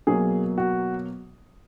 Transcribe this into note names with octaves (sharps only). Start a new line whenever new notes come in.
B2 F#3 A#3 G#4
F#4